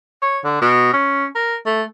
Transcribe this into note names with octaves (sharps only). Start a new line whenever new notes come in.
C#5
D3
B2
C#4
A#4
A3